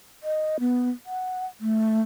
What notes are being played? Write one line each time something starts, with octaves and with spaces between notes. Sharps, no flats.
D#5
B3
F#5
A3